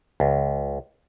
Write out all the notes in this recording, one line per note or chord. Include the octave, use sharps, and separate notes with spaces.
C#2